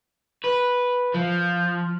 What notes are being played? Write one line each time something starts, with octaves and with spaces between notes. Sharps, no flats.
B4
F3